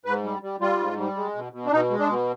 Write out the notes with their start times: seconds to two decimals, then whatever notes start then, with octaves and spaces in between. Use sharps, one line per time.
0.05 G#2 B4
0.24 G3
0.42 G3
0.60 G3 F4
0.79 G#2
0.98 G3
1.16 G#3
1.35 B2
1.53 B2
1.66 D4
1.72 B2 D#4
1.91 G#3
1.99 D4
2.09 B2